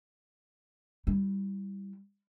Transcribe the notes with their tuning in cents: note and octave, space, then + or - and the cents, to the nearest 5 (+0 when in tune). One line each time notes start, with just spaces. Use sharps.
G3 +0 E4 +0